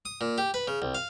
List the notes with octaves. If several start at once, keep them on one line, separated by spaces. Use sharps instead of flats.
D#6
A#2
G4
B4
C#3
C2
F5